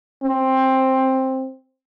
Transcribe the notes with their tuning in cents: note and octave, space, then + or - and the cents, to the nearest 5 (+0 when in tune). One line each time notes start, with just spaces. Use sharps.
C4 +10